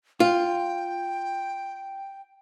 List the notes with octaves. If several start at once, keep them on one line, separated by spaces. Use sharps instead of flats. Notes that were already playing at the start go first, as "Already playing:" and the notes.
F4 G5